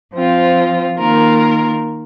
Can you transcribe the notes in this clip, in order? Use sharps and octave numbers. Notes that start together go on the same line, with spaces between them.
F3 C4 F4
D#3 A#3 F4 A#4